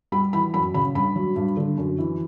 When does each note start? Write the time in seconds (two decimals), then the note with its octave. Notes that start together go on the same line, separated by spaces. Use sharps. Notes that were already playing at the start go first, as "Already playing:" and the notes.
0.12 G3 B5
0.33 E3 B5
0.54 F#2 B5
0.74 C#3 B5
0.95 G2 B5
1.16 F#3
1.36 G2
1.57 D3
1.78 F#2
1.99 E3